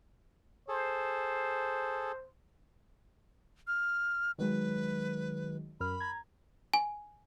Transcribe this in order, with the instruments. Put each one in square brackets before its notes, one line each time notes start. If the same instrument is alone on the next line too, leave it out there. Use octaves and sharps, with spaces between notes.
[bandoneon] G#4 A4 [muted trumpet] C5
[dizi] F6
[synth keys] D#3 F#3 G#3 [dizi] B4
[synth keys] F#2 A#4 F6 [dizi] B5
[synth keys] A#5 G#6
[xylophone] G#5